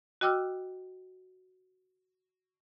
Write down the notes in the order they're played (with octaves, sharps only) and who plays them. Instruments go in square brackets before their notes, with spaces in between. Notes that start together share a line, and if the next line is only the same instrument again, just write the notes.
[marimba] F#4 D#5 G5 D6 E6 F6